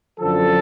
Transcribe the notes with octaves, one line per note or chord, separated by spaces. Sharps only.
F#2 D3 F3 A4